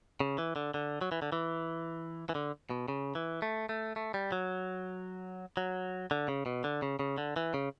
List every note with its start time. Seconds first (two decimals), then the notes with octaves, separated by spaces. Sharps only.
0.20 C#3
0.38 E3
0.56 D3
0.74 D3
1.01 F#3
1.12 E3
1.22 D3
1.32 E3
2.29 E3
2.35 D3
2.70 B2
2.88 C#3
3.15 E3
3.42 A3
3.69 A3
3.96 A3
4.14 G3
4.32 F#3
5.57 F#3
6.11 D3
6.28 C#3
6.46 B2
6.64 D3
6.82 C#3
6.99 C#3
7.18 D3
7.36 E3
7.54 C#3